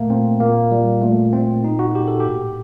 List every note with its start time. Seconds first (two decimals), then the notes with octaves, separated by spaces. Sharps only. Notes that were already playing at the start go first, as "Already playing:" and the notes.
Already playing: A#2 A3 A#3
0.10 A#2 C4
0.40 A#2 A#3
0.71 A#2 G3
1.02 A#2 A3
1.33 A#2 C4
1.64 A#2 D#4
1.79 F#4
1.94 A#2 G4
2.08 A4
2.20 G4
2.26 A2